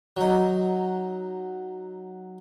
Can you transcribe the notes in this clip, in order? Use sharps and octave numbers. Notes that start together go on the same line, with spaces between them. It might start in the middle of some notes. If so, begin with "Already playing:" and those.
F#3 D#4